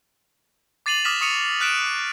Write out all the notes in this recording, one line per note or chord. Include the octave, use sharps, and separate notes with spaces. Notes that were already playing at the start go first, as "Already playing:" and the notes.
D6 A6 C7 D#7 F7 F#7
D6 D#6 F6 A#6 B6 E7
C#6 D#6 C#7 D#7 F7
F6 F#6 B6 D7 E7